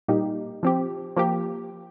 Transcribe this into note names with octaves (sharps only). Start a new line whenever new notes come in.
A#2 G3 A#3 D#4 G4
F3 C4 G4
F3 A#3 G4